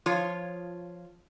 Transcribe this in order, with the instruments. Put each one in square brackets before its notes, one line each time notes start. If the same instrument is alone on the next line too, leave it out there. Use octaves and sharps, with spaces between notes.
[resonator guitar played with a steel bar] F3 F4 C#5